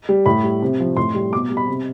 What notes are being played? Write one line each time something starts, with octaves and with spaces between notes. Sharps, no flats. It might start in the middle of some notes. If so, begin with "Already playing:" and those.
G3
A2 B5
G3
C3
F3
A2 C6
G3
B2 D6
G3
B5
C3